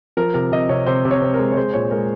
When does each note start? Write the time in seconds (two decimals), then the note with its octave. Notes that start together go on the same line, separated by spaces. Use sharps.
0.17 F3 A#4
0.34 C3 A#4
0.52 C3 D#5
0.69 C3 C#5
0.86 C3 C5
1.05 C3
1.11 C#5
1.21 C3
1.34 G#3 A#4
1.52 C#5
1.57 G#3 C5
1.74 A#2 C#5
1.91 G#3 A#4